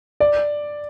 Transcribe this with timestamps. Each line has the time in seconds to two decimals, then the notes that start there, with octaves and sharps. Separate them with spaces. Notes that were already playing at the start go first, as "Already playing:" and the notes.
0.20 D5